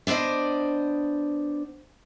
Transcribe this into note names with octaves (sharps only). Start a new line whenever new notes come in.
B3 D4 C5 D5 D#5